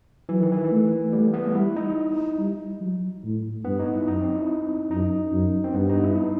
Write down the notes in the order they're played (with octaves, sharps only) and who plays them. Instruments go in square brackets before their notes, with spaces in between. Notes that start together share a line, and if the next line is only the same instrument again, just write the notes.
[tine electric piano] E3 [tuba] F#3
[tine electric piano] D#3
E3
[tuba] A3
[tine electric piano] G3 [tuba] A3
[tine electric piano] B3
[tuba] G3 [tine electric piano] E4
[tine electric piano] D#4
[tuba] G3
F#3
A2
[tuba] G2 [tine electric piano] B3
[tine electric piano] D#4
E4
[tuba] F#2 [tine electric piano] D#4
[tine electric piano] C4
E4
[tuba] F#2 [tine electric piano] D#4
[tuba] F#2
[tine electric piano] C4
[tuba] G2 [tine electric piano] B3
[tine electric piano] D#4
E4